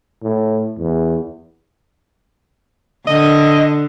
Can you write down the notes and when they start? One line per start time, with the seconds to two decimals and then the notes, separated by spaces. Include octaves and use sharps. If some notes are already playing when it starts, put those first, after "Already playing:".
0.22 A2
0.78 E2
3.07 D3 D#5